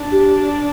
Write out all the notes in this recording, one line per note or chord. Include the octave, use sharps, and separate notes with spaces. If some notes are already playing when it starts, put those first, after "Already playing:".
Already playing: D4
G4